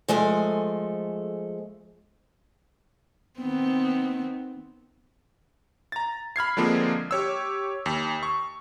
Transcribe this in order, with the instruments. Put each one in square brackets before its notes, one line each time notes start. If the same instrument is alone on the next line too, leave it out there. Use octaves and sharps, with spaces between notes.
[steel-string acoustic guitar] F3 G#3 A3 G#5
[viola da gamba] D#3 B3 C4
[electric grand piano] A#5 A6
B5 F6 G#6 C7
D3 F3 G#3 A#3 C4
G4 C#5 E6
D#2
C#6